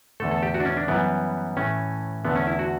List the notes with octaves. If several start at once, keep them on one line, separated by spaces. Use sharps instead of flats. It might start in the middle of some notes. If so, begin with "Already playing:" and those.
E2 D3 A3 A4
A4
G4
F#4
D4
C#4
D4
F#2 E3 G3 B3
A2 E3 A3 C#4
E2 D3 A3 B3
C#4
E4
F#4